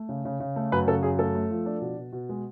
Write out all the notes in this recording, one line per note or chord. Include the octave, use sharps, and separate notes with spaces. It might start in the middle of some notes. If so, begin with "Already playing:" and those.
Already playing: A3
C#3
C#3
C#3
A3
F#2 B4
C#3 A4
F#2 G#4
A3 A4
A3
F3
D4
B2
B2
B2
G#3